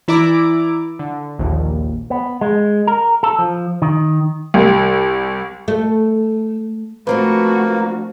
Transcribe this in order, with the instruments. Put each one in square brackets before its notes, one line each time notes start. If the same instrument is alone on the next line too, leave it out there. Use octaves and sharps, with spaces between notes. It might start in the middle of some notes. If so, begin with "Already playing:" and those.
[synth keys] E3 E4 D5 A#5 D6
D3
A#1 D#2
[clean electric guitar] B3
G#3
A#4
A4
F3
D#3
[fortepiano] C2
[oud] A3
[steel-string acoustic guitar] F3 C4 D4 [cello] A3 F#4 [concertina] A#3 [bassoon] B4